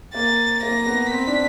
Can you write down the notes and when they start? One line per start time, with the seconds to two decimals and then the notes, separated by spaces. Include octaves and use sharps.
0.14 A#3 A6
0.63 A#3 A#6
0.86 B3
1.10 C4 B6
1.27 D4